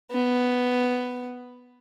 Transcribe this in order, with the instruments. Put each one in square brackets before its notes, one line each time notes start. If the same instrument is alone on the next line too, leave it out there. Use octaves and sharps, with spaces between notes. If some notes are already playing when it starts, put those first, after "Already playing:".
[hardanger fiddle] B3